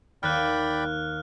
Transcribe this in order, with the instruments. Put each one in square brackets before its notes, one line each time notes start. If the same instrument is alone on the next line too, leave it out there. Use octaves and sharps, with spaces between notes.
[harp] D#2 [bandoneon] D5 G5 B5 [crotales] F6 F#6